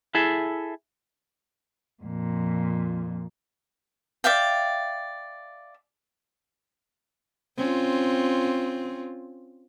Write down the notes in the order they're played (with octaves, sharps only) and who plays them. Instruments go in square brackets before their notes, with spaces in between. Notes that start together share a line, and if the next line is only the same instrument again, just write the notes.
[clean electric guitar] E4 G#4 A4 E5
[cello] F2 A#2
[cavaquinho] D5 E5 F5 G5
[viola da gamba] C4 C#4 F4